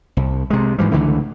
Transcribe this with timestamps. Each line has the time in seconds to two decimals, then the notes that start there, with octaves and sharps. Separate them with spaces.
0.17 C2
0.50 C3 G#3
0.78 G#2 E3 F3 G3
0.92 C#2 D3 E3 A3